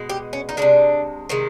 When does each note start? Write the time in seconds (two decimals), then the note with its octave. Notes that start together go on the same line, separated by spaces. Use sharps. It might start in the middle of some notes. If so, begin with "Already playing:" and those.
Already playing: B2 G#3
0.09 G4
0.33 C#4
0.49 D#4
0.57 D#3 G#3 D4
0.62 C3
1.29 C3 D#3 G#3